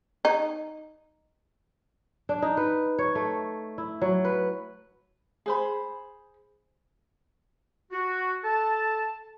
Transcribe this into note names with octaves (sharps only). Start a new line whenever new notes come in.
D#4
D4
D#4
B4
C#5
A3
E4
F#3
B4
G#4 C5 B5
F#4
A4 A5